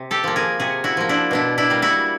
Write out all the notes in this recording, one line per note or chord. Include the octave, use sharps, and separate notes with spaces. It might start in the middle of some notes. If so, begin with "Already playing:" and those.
Already playing: C3
G4 A4
F3 A#3
G#4 A#4
C3 F#4 G#4
E4 F#4
F3 A#3
D4 E4
B2 D4 E4
D4 E4
G3 A#3
E4 F#4